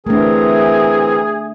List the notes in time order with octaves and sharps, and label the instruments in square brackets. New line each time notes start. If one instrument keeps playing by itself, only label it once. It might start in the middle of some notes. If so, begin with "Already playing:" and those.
[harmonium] E3 C4 A#4 [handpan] A3 D4 [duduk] G#4